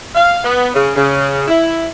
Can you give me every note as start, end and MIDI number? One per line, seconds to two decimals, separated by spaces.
0.15 0.41 77
0.44 0.69 59
0.74 0.92 49
0.96 1.45 49
1.48 1.87 64